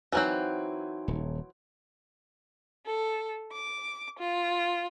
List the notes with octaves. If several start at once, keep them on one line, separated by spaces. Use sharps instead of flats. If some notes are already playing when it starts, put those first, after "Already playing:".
E3 F#3 C4 D#4 F#4 G#5 F#6
D#1
A4
D6
F4